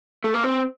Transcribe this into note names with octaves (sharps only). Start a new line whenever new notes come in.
A3
A#3
C4